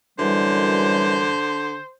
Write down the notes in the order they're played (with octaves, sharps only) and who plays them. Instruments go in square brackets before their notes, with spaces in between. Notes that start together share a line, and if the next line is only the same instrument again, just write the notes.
[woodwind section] F#2 E3 G3 [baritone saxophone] D3 [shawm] C5